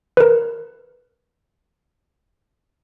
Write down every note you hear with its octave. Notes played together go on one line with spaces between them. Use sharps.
A#4 B4